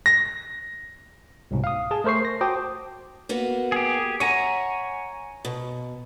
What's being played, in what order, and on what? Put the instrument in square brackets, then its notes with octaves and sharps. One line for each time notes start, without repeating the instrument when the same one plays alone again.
[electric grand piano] A#6
[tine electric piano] C2 G#2 B2
F5 D#6
G#4 A5
A3 A#4 C5 C#6 C7
A#6
F#4 C5 G5 A5 D6 D#6
[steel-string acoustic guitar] A#3 B3 F#4
[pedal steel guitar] G4 G#4
[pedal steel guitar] C#5 G#5 A#5 [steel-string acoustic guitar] E5 F#5
[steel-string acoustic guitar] B2